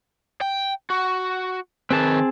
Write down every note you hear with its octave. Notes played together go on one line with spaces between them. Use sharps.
G5
F#4
D#3 C4 G#4 B4 A5